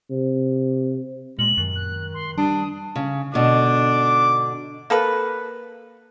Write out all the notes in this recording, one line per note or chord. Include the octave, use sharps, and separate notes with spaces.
C3
A#2 G#3 F#7
F#2 D#3
F#6
C6
G3 D4 D#6
C#3
G#2 B2 D3 D4 D6
A#3 A4 B4